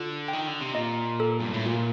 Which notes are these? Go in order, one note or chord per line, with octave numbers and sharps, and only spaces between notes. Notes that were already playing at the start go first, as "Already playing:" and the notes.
Already playing: D3 F4
D#3 G5
D3
C3
A#2 D#5
A4
G2
A2
A#2 F4